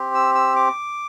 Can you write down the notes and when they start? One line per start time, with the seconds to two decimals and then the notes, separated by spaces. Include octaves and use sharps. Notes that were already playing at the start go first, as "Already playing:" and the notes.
Already playing: C4 G4
0.14 E6
0.35 E6
0.56 D6